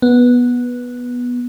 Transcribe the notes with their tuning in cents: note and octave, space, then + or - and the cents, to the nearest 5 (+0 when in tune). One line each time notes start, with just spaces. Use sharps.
B3 -10